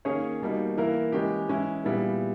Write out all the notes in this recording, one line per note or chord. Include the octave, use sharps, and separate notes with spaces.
D#3 A#3 C#4 G#4 C#5
B2 G3 A#3 D#4
E3 A#3 E4 A#4
E3 G#3 C#4 G4
E3 G#3 C#4 E4
A#2 G3 B3 E4 G#4